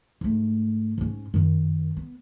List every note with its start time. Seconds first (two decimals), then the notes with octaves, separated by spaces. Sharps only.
0.21 G#2 A3
0.98 G#2 C#4
1.34 F#2 D#3
1.97 B3